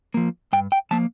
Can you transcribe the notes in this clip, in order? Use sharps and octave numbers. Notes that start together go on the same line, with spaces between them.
F3 A#3
G2 G5
G5
F3 A#3 A5